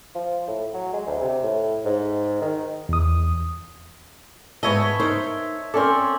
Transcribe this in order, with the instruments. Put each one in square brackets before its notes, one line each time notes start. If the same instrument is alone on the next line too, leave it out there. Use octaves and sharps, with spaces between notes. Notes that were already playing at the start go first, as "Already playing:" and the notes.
[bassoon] F3
A2
F#3
G#3
D2
C3
A2
G#2
D#3
[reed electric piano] E2 D#6
[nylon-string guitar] G#2 B3 D#5 [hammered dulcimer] C#5 E5 A5
[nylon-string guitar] D#4 A#4 C5
[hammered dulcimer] C4 C#4 D5 [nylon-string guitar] A4 A#4